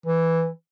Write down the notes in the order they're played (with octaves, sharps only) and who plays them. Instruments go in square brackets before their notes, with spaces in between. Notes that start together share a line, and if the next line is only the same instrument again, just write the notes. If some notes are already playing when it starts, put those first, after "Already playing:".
[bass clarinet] E3